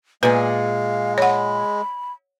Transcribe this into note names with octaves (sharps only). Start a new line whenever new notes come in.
A#2 G#3 G#4 B4 F5
C#5 F#5 B5